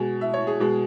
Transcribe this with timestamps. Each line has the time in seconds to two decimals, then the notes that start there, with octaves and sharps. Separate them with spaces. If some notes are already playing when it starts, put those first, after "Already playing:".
Already playing: B2 G#3 G#5
0.21 E5
0.34 C#5
0.47 G#4
0.60 B2 G#3